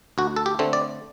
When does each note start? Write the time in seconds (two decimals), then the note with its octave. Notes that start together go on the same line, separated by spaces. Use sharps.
0.18 D2 F#4
0.36 A4
0.46 G4
0.59 D3 A3 C4
0.73 D5